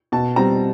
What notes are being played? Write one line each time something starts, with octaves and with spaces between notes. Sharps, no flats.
B2 A5
G3 C4 A#5